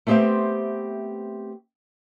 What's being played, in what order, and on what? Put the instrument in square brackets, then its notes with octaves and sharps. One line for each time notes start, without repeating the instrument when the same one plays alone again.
[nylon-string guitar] A3 B3 C4 G4 C5 E5